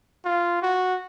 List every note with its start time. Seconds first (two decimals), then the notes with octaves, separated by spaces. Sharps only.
0.25 F4
0.62 F#4